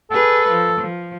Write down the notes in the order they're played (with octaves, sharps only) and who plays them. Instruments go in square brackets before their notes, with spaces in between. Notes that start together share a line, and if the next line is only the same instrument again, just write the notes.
[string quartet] G#4 B4 [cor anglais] A4
[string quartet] F3
F3